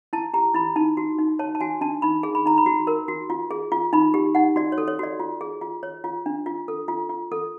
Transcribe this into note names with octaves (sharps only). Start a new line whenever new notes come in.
E4 A5
G4 A#5
E4 B5
D#4 A5
F#4
D#4
C#5 A5
A5
F#4 G#5
D4 A5
D#4 B5
G#4
B5
D#4 A#5
B5
F#4
A#4
F#4
F4
G#4
F4
D#4 B5
G4
D#4 F#5
F#4 D5
C#5
A4
C#5
F#4 D5
F4
G#4
F4
C#5
F4
D4
F4
A4
F4
F4
A4